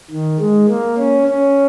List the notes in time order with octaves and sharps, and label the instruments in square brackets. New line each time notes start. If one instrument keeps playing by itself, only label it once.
[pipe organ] D#3
G#3
A#3
C#4
C#4